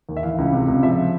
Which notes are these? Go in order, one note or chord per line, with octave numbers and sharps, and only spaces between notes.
D#2
E5
E3 F5
C#2
C3
C#2
F3 E5